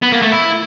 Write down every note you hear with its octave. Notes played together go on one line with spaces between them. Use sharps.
B3
A#3
A3
E4